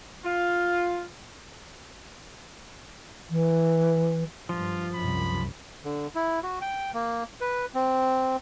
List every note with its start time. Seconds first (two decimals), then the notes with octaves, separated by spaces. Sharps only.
0.24 F4
3.30 E3
4.49 G2 F3 F4
4.94 C2 F#2 B5
5.85 D3
6.15 E4
6.43 F#4
6.61 G5
6.94 A#3
7.41 B4
7.75 C4